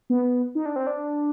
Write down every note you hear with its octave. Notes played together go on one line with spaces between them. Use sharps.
B3
D#4
D4
C4
D4